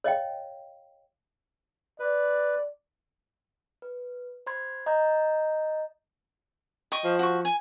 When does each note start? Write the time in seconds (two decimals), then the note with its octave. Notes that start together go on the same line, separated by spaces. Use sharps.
0.04 C#5 D#5 F5 G5
2.00 B4 D5
3.82 B4
4.47 C5 B5 C6 G#6
4.86 D#5 A#5 G6
6.92 D#5 G5 C#6
7.04 F3
7.19 F#4 C#6
7.45 G#5